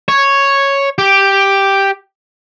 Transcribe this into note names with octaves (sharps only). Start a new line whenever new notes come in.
C#5
G4